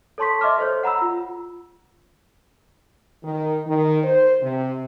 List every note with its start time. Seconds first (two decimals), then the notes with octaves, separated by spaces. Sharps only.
0.18 A4 C#5 A5 C6 C#6 B6
0.41 D#5 E5 C6 D6 F6
0.58 A4 C5 C#5
0.84 F#5 A#5 B5 E6
1.01 F4
3.23 D#3
3.66 D#3
4.04 C5
4.41 C3